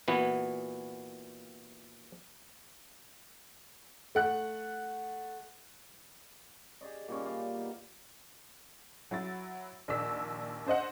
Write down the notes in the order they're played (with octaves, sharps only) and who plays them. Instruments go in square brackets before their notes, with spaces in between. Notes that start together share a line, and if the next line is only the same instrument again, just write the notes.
[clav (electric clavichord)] A#2 E3 B3 F#4
[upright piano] A3 F#5 F#6
[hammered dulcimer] G4 G#4 D5 D#5
A#2 G3 C#4
D5 F5
B3 D#4
[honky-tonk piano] F#3 E4 A6
A#1 D#2 D4 D5 E6 B6
D4 C5 D#5 F#5